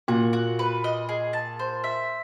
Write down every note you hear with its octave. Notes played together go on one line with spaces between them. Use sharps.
A#2 F#4
F#4
B4
D#5
G#4
A5
C5
E5